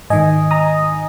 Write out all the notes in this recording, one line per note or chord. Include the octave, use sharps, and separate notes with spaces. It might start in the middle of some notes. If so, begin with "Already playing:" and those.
G#2 D#3 D#5 G#5
A#5 D#6